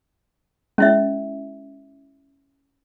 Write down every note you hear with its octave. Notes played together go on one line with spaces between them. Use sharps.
G#3 C#4 E4 E5